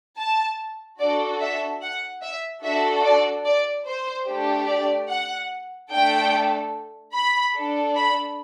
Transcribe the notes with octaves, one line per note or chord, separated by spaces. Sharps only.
A5
D4 F#4 A4 D5
E5
F#5
E5
D4 F#4 A4 E5
D5
D5
C5
A3 D4 G4
D5
F#5
A3 D4 A4 G5
B5
D4 A4
B5